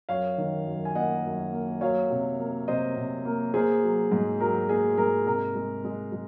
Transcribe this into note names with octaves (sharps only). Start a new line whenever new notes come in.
F#2 C#5 F5
D#3
F#2
G#5
A#3 D#5 F#5
F#2
A#3
F#3 C#5 F5
C3
A#3
C3 C5 D#5
C3
A#3
A#3 G#4 C5
F#3
G#2
F#3 A#4
A#3 G#4
G#2 A#4
C3 A#4
G#3
G#3
G#3